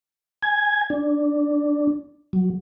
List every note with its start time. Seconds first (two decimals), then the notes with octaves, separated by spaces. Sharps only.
0.42 G#5 G#6
0.90 D4
2.33 F#3